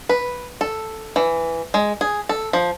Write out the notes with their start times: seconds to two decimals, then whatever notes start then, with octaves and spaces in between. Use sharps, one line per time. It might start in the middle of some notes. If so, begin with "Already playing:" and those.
0.09 B4
0.61 A4
1.16 E3
1.74 G#3
2.01 G#4
2.29 A4
2.53 F3